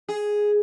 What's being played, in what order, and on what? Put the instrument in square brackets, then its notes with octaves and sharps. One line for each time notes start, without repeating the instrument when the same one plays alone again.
[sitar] G#4